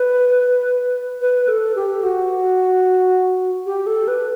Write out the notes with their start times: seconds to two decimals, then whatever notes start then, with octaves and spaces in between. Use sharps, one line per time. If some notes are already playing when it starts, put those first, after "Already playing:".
Already playing: B4
1.21 B4
1.48 A4
1.76 G4
2.03 F#4
3.66 G4
3.87 A4
4.08 B4